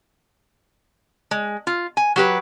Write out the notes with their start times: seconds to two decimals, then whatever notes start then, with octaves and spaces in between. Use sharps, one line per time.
1.31 G#3
1.67 F4
1.97 G#5
2.16 F#3 G4 B4